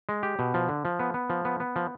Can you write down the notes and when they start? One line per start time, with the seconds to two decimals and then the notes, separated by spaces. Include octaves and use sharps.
0.09 G#3
0.23 G4
0.39 B2
0.54 F3
0.69 D3
0.85 F3
1.00 B3
1.14 B3
1.30 F3
1.45 B3
1.60 B3
1.76 F3